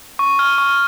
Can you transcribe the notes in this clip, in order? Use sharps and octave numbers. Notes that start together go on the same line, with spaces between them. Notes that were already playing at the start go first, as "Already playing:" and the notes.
C#6
F6
C#6